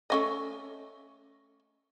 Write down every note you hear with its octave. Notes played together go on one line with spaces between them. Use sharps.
A3 C#4 D#5